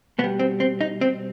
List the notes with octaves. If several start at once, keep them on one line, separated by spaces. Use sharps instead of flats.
B2 B3
G3
C4
C4
D#4
C4